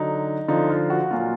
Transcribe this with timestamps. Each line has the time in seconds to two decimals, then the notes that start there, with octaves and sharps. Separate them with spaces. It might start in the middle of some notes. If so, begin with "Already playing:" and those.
Already playing: D3 F#3 D#4
0.48 D3 F3 D#4
0.70 F4
0.90 F#4
1.11 A#2 F#3 F4